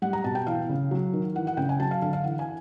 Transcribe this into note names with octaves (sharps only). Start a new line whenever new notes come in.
G3 F#5
A#5
B2 A5
G5
E3 F5
C#3
F#3
D#3
E3 F#5
F#5
C#3 G5
G#5
F#3 A5
F5
D3 F5
F5
E3 F#5
G#5